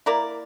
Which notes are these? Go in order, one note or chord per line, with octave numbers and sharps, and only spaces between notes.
A#3 E4 A#4 D5